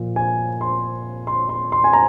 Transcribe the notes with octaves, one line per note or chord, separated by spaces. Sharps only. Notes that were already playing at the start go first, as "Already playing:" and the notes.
Already playing: A#2 F3
G#5
C6
C6
C6
C6
G#5
A#5